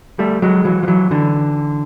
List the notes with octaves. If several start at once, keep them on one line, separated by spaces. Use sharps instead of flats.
G3 A3
F#3 G#3
E3 F#3
F3
E3 F#3
D3 E3